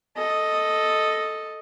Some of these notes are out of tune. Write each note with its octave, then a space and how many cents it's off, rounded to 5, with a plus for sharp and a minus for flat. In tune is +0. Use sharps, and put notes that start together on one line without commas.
A4 +0 D#5 +0